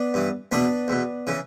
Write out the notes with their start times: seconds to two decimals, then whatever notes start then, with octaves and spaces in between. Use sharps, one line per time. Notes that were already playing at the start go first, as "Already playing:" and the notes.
Already playing: B3 D4
0.14 G2 E3
0.52 E2 B2 B3 D4
0.88 E2 B2
1.27 C#3 E3